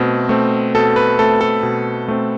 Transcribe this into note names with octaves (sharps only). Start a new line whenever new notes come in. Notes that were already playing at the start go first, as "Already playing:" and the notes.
Already playing: B2 A3 C4
A3 C4
B2 A4
B4
A3 C4 A4
A4
B2
A3 C4